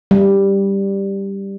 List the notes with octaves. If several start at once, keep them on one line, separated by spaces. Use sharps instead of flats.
G3